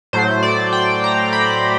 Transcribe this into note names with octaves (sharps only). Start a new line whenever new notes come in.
A2 F#3 A3 C5
D5
G5
A#5
B5